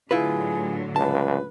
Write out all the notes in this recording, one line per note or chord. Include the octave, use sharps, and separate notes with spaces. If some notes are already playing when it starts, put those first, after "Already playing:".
A2 D3 F#3 E4 F4 G#4 B4
C#2 B4 A5